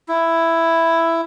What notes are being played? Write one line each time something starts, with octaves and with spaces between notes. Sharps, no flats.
E4